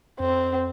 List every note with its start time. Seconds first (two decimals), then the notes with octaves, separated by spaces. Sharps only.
0.20 F2 C4